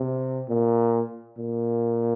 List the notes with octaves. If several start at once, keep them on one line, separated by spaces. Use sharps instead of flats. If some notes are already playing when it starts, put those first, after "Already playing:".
Already playing: C3
A#2
A#2